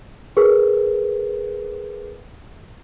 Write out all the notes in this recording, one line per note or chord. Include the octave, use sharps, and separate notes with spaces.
G#4 A#4 B4